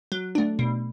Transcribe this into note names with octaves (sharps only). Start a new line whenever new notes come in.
F#3
A3 D4
B2